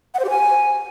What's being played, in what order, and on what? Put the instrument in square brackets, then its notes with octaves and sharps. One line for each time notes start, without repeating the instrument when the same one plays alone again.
[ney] F#5
C5
G4
G#5